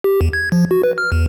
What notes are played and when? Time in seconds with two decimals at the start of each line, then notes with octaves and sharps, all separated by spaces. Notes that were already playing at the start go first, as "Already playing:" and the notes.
0.04 G4
0.21 E2
0.33 G#6
0.52 F3
0.71 F#4
0.83 B4
0.98 F6
1.12 E2